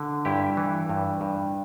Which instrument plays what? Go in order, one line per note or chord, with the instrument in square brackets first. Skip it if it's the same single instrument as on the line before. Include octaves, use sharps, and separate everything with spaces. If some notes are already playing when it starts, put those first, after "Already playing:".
Already playing: [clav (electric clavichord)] D3
G2 E4 G4
E3
G2
G2